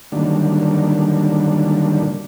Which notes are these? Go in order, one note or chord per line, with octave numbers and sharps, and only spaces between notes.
D3 D#3 F#3 G3 A#3 D4